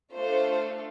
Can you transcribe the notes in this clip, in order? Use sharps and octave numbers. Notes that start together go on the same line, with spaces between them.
A3 D4 F4 A4 C5